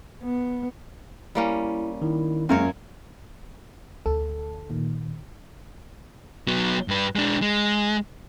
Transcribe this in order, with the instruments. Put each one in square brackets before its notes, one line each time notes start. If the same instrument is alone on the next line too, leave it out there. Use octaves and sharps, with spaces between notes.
[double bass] B3
[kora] G3 A#3 C#4 [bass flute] E4
[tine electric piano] D#3 [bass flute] E4
[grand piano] F#2 [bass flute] G#3 [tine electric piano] A#3 [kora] F4 A#4 C#5
[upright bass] D2 [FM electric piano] A4
[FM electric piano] A#2 D#3
[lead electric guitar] F#3 B3
G2 B4
G#3 D4
G#3